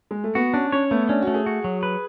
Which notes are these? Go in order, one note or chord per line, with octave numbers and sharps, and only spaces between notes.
G#3
A3
B3 F#4
C#4 D4
C#4 C#5
A3 B3
C#4 D4
F#4
A3
G#4
F#4
F#3
B4